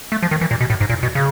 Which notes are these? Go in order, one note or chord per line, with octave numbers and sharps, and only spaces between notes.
A3
F3
D#3
E3
A#2
B2
A2
G#2
A#2
B2
C#3